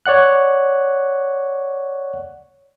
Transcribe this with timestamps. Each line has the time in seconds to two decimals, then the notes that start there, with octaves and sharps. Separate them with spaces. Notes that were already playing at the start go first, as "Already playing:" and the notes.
0.06 C#5 D5 F#5 F#6